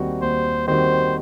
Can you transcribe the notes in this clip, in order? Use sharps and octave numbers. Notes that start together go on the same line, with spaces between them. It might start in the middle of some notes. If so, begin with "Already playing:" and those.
Already playing: D#2 D#3 G3 C4 F#4
D#2 C5
D#3 G3 C4 F#4 C5